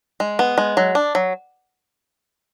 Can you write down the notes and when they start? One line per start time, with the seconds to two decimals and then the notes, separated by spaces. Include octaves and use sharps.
0.20 G#3
0.39 B3
0.58 G#3
0.77 F#3
0.95 D4
1.15 F#3